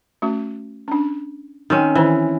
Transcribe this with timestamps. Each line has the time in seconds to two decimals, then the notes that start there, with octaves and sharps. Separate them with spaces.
0.22 A3 C#4 F#4
0.88 C#4 D4
1.70 D#3 C4 C#4
1.95 D#3 E3 C5